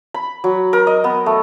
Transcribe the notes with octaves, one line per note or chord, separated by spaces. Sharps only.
B5
F#3
A#4
D#5
B3
A3